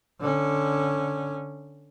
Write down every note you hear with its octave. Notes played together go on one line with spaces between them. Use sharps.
D3 C#4